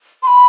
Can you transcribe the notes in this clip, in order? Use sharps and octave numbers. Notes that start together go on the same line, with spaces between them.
C6
B5